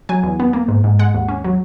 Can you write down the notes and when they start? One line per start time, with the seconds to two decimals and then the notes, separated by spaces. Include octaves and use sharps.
0.09 F#3 G#5
0.23 E2
0.40 B3
0.53 A#3
0.68 G#2
0.84 G#2
0.99 G#3 F#5
1.14 D#2
1.28 C#4
1.44 F#3